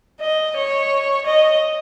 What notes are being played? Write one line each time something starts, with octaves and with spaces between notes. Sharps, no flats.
D#5
C#5
D#5